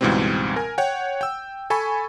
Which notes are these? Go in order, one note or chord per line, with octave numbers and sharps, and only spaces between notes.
C#2 G#2 B2 E3 G3 C4
A#4 G#5
C#5 F#5 G5
G5 E6
A4 G#5 B5 C#6